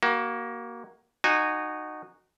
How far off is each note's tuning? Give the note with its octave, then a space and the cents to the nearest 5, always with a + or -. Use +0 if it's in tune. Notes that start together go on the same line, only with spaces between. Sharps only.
A#3 +15 F#4 +30
D#4 -25 F#4 +0 G#5 -15